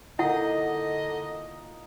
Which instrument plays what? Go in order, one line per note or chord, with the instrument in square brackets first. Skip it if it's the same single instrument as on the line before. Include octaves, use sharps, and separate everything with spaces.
[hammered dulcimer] A#2 D#4 [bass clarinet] D3 [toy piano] E4 F#5 [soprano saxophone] D#5